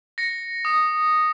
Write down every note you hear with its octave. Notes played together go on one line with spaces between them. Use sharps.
A#6 C#7
D#6